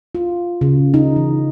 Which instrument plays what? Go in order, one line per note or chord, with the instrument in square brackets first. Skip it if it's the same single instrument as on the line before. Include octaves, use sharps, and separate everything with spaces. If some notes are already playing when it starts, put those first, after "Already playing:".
[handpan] F4
C#3
D#4
E3